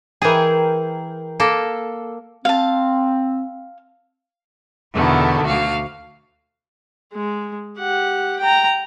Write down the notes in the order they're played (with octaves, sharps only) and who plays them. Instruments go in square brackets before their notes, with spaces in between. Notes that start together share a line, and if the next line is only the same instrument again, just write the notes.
[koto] E3 G#4 [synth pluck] A#4 G5
[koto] A#3 A4
[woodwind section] C4 [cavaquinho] F5 A5
[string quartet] E2 B2 D3 D#3 A3 B3
D2 F#4 F5
[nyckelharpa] G#3
G4 F#5
G5 A#5